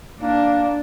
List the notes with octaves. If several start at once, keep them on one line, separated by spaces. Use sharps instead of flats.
A#3 D4